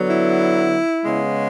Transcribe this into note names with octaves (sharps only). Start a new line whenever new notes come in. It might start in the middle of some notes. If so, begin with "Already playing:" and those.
Already playing: D3 F#3 B3
E4
C#3 G#3 B3